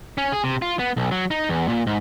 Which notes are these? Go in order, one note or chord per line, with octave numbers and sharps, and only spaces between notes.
C#4
G#4
C3
F4
B3
B1
F#3
D#4
E2
A#2
G#2